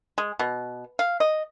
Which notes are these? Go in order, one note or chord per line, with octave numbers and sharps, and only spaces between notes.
G#3
B2
F5
D#5